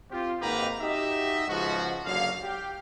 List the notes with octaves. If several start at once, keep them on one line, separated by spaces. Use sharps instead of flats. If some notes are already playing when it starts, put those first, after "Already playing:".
C4 F4 G4
G#1 G#2 A#3 G4 B4 A#5
D#4 F#4 G4 D#5 E5
C#2 G#2 F3 F#4
F#1 D3 F#3 F5
G4